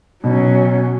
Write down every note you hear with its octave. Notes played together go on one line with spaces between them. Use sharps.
B2 F#3 C#4